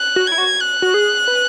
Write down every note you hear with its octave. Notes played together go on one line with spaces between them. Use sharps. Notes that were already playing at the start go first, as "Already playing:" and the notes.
Already playing: F#6
F#4
E4 G#6
F#4
F#6
F#4
G#4
B4